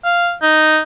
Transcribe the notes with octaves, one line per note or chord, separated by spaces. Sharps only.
F5
D#4